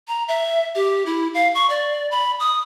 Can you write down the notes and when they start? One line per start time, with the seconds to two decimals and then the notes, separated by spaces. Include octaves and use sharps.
0.08 A#5
0.28 E5
0.76 G4
1.06 E4
1.34 F5
1.55 C#6
1.70 D5
2.11 B5
2.40 D#6